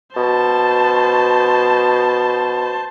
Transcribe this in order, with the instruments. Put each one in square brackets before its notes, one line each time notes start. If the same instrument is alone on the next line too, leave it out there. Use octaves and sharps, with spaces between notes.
[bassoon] B2 [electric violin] C5 A5